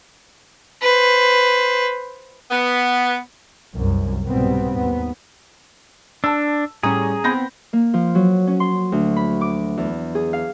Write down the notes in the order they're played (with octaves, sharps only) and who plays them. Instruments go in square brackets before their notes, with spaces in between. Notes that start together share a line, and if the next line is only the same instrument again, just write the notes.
[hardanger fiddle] B4 C5
[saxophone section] B3
[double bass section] C2 F#2
C2 G#2 B2 G3 B3 C4
D#2 B3
[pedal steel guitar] D4 [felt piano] A5 E6
[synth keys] A2 G3 C#4 [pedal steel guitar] G#4 [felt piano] A#5 D#6
[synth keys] B3 C4 [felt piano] B5 G6 A#6
[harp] A#3
F3
F#3
C#4
C6
D2
B5
D6
E2
G#4
F5